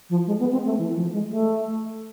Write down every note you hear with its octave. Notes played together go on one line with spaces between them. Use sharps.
F3
G#3
B3
C4
A3
E3
F3
G#3
A3